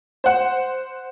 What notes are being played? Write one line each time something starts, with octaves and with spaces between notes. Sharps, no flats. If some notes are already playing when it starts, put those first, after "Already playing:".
C5 F#5